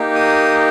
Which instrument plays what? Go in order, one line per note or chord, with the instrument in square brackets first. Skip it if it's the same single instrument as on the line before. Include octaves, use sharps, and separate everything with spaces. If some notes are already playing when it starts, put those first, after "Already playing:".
Already playing: [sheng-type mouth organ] A#3 D#4 G4
D#6